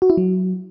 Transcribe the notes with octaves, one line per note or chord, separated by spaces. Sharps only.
F#4
E4
F#3